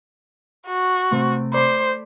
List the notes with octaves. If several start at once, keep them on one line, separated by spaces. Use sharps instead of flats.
F#4
C3 A3 C4
C5 D5 B5 C6